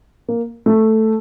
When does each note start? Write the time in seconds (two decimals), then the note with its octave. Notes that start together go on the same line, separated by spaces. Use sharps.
0.28 A#3
0.66 A3